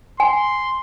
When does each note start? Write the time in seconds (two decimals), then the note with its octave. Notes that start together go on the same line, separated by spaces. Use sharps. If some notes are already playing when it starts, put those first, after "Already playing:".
0.20 G#5 C6